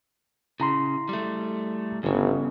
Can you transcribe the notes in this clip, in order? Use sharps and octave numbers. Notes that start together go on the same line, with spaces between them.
C#3 E4 A#5 C6
G3 A3
G1 E2 C#3